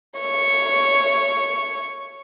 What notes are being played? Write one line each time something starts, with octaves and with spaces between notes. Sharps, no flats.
C#5 C#6